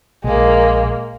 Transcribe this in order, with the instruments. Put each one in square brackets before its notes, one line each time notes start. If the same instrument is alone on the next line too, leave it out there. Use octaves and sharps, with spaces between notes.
[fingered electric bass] A#1 [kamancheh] G#3 A#3